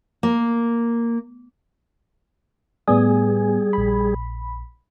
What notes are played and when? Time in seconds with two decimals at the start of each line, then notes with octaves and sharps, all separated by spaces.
0.23 A#3
2.88 A2 G3 B3 G#4 G#5
3.73 A#1 B5